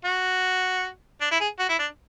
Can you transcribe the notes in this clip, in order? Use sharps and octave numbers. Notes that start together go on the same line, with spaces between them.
F#4
D4
E4
G#4
F#4
E4
D4